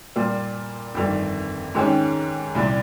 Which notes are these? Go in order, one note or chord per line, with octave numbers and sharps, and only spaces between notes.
A#2 G3 A#3 F4
G1 F2 D#3 G3
G#2 D#3 G#3 C#4 G4
C2 A#2 G3